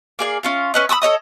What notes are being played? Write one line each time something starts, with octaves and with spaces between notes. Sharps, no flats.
A#3 G#4 D5
C#4 F4 F5
C#4 B4 D#5
B5 C#6 D#6 E6
A4 C#5 D#5 D#6